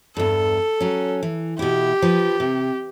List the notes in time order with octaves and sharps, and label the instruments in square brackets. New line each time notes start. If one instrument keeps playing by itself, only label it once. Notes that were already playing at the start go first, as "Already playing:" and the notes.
[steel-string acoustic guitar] E2 G2 [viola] A4
[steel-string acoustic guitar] F#3 C#4
E3
[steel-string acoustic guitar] B2 E4 [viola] G4
[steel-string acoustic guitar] F3 B4
C3